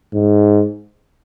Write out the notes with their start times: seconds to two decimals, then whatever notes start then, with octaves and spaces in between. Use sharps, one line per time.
0.13 G#2